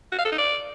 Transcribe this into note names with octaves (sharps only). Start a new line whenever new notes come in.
F#4
F5
A4
D#4
D5